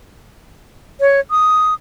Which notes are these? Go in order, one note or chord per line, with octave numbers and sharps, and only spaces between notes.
C#5
D#6